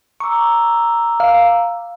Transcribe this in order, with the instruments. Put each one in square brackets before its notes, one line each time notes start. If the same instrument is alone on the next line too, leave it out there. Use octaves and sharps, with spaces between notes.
[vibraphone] A#5 D6 E6 [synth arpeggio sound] C#6
[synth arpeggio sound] F5